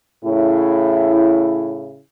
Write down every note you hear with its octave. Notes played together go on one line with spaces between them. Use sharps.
A2 C#3 E4